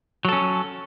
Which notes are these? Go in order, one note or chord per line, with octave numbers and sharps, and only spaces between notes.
F#3 C#4 A4